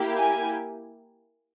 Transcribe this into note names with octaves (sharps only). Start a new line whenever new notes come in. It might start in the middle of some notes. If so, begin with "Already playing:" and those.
Already playing: A#3 E4 G4
G#5